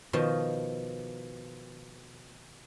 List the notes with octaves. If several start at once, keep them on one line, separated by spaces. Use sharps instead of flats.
B2 D#3 F3 D#5 A5